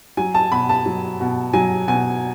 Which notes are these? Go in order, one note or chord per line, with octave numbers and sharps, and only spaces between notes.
F#3 G#5
A5
B2 B5
A5
F#3
B2
F#3 G#5
B2 G#5